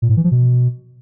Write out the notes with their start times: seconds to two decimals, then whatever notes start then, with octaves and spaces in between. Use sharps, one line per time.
0.02 A#2
0.09 A2
0.17 E3
0.24 F3
0.31 B2